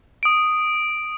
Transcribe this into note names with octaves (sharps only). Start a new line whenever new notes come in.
D#6 D7